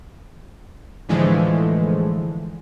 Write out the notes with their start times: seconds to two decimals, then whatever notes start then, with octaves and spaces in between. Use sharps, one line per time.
1.09 A2 D3 E3 F3 G#3 A3